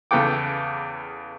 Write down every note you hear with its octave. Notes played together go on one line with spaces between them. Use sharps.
E2 C#3 B3 A4 G5 D6